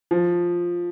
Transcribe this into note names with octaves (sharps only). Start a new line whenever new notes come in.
F3